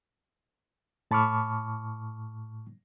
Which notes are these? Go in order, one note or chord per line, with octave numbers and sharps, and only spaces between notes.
A2 A5 B5 C#6 D6 F6